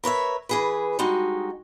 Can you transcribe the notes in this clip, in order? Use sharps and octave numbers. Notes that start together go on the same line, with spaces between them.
A#4 B4 C#5 E5
E3 G#4 B4
G3 G#3 D#4 F#4